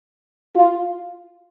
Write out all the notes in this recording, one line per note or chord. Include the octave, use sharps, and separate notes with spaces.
F4